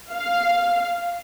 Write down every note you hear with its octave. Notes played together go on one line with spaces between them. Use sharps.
F5